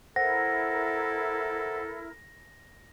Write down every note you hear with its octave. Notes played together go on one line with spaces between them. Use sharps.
E4 A4 A#4 C5 F#5 A#6